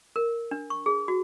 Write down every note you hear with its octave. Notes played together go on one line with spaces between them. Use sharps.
A#4
D4
C#6
G#4
F#4